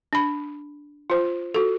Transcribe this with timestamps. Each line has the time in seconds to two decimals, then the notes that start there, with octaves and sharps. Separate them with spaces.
0.13 D4 B5
1.10 F4 C5
1.54 F#4 A4